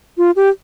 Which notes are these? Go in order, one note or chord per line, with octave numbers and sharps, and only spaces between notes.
F4
G4